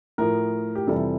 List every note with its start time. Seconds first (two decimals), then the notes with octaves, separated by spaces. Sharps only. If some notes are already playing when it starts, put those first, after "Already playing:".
0.18 A2 F3 A#4
0.75 G4
0.87 F2 C3 E3 G3 A4